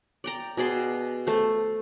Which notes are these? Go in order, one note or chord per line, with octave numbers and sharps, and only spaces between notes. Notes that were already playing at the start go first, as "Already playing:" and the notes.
D5 G5 A#5
B2 G#4 D5 C6
A3 C5